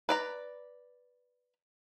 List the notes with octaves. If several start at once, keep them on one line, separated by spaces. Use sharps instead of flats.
B4 D5 A#5